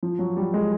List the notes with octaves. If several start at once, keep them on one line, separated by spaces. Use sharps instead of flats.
F3
F#3
G3
G#3